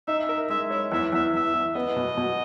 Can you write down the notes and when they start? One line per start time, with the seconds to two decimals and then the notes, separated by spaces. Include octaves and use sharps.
0.08 D#4 E5
0.29 A#4 E5
0.50 G#3 E5
0.71 C#5 E5
0.92 E2 E5
1.13 E2 E5
1.33 E2 E5
1.54 E2
1.75 B3 D#5
1.96 B2
2.17 B2